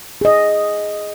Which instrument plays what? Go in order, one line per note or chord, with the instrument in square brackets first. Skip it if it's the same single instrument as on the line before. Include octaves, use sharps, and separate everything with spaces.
[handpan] G#4 D#5